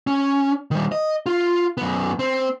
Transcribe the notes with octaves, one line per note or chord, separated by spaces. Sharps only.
C#4
D#3 G3
D#5
F4
F#2 B3
C4